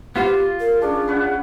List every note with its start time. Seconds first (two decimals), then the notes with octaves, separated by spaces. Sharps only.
0.16 B3 F4 G4 C5
0.30 F4
0.60 A#4
0.82 C#4 D4 G#4
1.08 C#4 B4 F#5